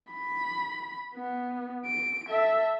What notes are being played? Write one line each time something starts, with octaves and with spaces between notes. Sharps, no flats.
B5
B3
D7
A4 E5